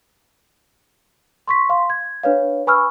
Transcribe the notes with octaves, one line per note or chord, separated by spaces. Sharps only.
C6 C#6 B6
F5 C6
G#6
D4 B4 C#5 F5
B4 G#5 B5 C#6 E6 F6